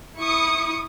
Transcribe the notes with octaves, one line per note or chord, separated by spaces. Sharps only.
E4 C#6 D#6 C#7